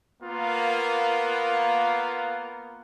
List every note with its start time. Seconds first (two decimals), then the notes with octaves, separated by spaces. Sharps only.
0.23 A#3 B3 F4 A#4